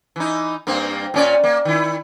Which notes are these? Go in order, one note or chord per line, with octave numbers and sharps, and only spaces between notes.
E3 D#4
G2 A#3 C4
A#2 C#4 D5
A#3
D#3 E4